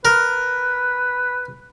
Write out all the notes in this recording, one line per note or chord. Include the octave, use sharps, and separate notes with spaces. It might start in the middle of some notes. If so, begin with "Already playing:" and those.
A#4 B4